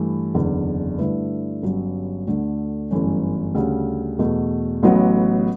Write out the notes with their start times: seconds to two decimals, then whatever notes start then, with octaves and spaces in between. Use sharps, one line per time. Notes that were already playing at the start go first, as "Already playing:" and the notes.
Already playing: G2 E3 A3
0.34 F#1 E2 D3
0.98 G2 D3 A3 E4 B4
1.63 G1 G2 F#3 C#4
2.27 D2 D3 A3
2.91 G1 F#2 E3 A3 C#4
3.55 D2 C#3 G3
4.19 E2 B2 A3
4.83 A1 A2 F#3 B3 F#4